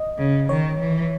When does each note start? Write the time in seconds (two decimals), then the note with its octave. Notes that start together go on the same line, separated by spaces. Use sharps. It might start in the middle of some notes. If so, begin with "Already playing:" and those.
Already playing: D#5
0.18 C#3
0.49 D#3 C#5
0.80 E3